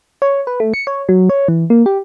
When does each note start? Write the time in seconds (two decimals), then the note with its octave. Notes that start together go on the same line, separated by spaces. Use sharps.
0.22 C#5
0.47 B4
0.60 A3
0.74 C#7
0.87 C#5
1.09 F#3
1.30 C#5
1.48 E3
1.70 A#3
1.86 G4